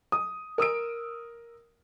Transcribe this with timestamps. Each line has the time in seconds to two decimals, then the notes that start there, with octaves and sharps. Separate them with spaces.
0.12 D#6
0.58 A#4 D#6 E6 D7